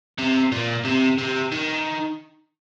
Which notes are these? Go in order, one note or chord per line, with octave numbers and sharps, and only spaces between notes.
C3
A#2
C3
C3
D#3